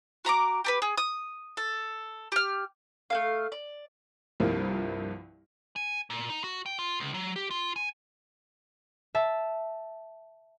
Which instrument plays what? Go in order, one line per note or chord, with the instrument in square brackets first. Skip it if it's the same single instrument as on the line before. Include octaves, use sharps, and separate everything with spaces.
[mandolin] F#4 A#5 B5 D6
G4 A#4 B4
G#4
D#6
A4
G4 F6
A3 A#3 F5
D5
[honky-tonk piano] C2 G2 F3 A#3
[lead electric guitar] G#5
A#2
D#4
F#4
G5
F4
C#2
F#3
G4
F4
G#5
[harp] E5 A5